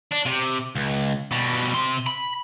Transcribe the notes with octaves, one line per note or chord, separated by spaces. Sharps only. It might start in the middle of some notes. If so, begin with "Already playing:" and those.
D4
C3
C#2
B2 G3
C3 C6
B5